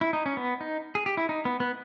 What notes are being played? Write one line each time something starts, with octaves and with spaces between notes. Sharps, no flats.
E4
D#4
C#4
B3
D#4
G#4
G4
E4
D#4
B3
B3